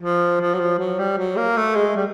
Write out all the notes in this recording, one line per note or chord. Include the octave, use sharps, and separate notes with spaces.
F3
F3
F#3
F3
F#3
G3
F#3
A#3
A3
G#3
G3